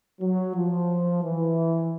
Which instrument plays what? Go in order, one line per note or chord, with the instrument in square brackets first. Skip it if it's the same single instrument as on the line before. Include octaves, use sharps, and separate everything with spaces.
[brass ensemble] F#3
F3
E3